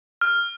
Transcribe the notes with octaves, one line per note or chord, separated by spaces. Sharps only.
F6